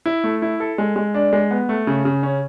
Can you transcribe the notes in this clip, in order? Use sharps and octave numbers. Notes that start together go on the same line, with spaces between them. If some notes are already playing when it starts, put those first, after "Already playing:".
E4
A3
E4
A4
G#3
G#3
D4
G#3
B3
A3
C#3
C#3
C#4